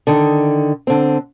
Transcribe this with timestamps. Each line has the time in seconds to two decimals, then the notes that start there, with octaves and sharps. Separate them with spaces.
0.07 D3 D#3
0.87 D3 C4